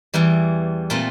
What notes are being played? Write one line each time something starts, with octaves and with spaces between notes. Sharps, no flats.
E2 E3 G3
A#2 A3 C4 F4